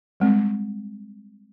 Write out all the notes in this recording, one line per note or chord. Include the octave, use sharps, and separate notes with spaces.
G3 G#3 C4